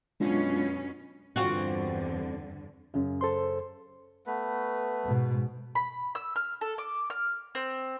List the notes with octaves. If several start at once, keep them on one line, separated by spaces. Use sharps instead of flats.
F#2 B2 G#3 C#4 D4 F4
E2 G2 D3 C4 F4 F#4
F#2 C#3
A4 C5 C6
A3 B3 B4
G#2 B2
B5
E6
F6
A4
D6
F6
C4